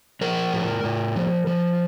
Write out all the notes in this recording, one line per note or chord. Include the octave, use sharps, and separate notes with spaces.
F3 A#4
A2
A2
F3
F3